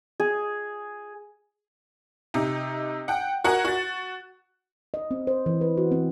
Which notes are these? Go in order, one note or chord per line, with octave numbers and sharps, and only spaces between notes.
G#4
C3 D#4
F#5 G5
F#4 A#4 F#5 G#5
F#4 A6
D#5
C4
C5
E3
B4
F#4
C4